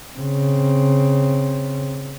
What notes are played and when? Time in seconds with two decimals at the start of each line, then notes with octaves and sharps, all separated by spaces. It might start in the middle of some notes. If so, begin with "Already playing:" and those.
0.17 C#3 C4